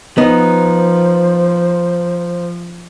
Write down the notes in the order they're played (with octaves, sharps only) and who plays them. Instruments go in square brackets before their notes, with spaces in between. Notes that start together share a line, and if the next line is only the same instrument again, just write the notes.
[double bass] F3 [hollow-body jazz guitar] B3 [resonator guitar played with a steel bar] D#4 [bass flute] C5